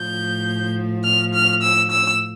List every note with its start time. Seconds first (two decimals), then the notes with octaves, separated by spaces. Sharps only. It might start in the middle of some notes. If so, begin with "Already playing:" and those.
Already playing: A2 F3 G6
1.04 F6
1.34 F6
1.62 E6
1.91 E6